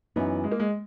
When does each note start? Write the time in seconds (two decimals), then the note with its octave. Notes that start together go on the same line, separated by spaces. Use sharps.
0.16 F#2 E3 B3 D#4 E4
0.44 G#3
0.52 A#3
0.60 G#3